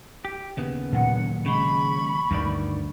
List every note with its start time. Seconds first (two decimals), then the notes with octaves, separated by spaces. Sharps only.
0.25 G4
0.57 D#2 C#3 B3
0.93 A#2 D#3 F#3 F#5
1.46 C#3 G#3 B5 C#6
2.31 D2 G2 D#3 D5